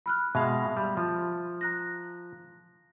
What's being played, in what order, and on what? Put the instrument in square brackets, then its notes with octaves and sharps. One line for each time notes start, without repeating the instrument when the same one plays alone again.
[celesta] B5 F6 F#6
[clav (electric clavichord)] B2 G#3 F5 [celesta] E5
[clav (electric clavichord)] G3
F3
[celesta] A#5 F#6 A#6